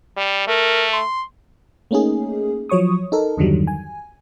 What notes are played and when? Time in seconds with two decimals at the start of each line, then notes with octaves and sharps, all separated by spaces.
0.17 G3
0.48 A3 A#4
0.93 C6
1.91 A3 A#3 C#4 D#4 G#4
2.69 F3 F#3 C#5 C#6 D#6
3.12 D#4 A4 A#4
3.38 E2 G2 D3 D#3 F#3 G3
3.67 G#5